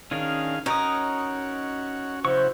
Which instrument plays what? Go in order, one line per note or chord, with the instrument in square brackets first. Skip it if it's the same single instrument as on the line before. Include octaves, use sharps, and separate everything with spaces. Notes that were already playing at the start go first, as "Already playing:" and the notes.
[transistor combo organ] D#3 G#4 F5 [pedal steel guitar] C#4 D4 A#4
[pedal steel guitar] C#4 A#4 D#6 [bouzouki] D#4 [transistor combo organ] F#4 C#5
[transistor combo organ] C#3 E4 F#4 [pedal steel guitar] F#3 C#6 [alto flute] C5